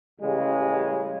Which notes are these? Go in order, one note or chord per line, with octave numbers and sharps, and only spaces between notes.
A1 C#3 G3 G#3